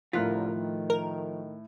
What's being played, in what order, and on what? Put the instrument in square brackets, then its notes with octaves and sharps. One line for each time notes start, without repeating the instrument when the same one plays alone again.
[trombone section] C2 D3 A#4 [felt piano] A2 F#6 B6 [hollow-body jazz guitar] F3 F4
[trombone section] D#3 A3
[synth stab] A#4